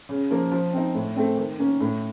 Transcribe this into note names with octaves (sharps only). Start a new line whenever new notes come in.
C#3
F3 A#3
F3
C4 D#4
A2
A3 C4
D#3
A#3 C#4
A2